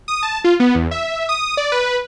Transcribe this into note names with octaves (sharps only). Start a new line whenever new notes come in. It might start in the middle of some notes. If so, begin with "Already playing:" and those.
D#6
A5
F4
B3
E2
E5
D#6
D5
B4